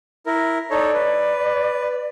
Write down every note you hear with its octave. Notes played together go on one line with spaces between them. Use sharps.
E4 A#4
D#4 A4 C#5 D5
B4